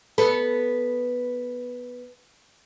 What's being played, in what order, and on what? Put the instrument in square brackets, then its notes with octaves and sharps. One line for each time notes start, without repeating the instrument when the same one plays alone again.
[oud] B3 A4